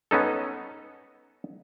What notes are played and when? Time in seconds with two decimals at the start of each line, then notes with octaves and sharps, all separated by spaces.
0.11 B3 C#4 D#4 A4